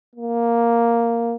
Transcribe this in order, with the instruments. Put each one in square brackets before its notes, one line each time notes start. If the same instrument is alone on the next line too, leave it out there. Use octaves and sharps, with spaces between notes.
[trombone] A#3